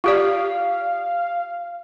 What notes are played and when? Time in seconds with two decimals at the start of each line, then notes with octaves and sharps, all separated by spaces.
0.04 F4 G4 D5 F5